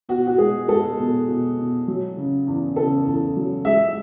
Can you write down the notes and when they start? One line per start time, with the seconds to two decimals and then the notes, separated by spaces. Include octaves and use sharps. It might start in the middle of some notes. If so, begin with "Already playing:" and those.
0.09 B2 F#4
0.27 F#4
0.38 G#3 G#4
0.68 G#3 A4
0.99 B2
1.28 B2
1.57 B2
1.88 F#3
2.17 C#3
2.47 E2
2.76 C#3 A4
3.06 E2
3.36 F#3
3.65 G#3 E5